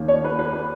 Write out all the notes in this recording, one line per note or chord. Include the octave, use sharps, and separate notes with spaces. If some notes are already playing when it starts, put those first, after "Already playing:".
Already playing: D#2 D#3 A#3 C#4
C#5
B4
B4
B4